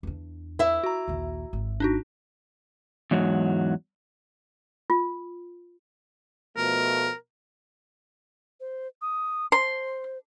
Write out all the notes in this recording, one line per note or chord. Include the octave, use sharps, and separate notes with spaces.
E2 D4
E4 E5
F#4 A#5
A#1 D#2
G#1
D4 D#4 F#4
E2 G#2 F#3
F4
B2 F3 A3 A#4
C5
D#6
C5 C6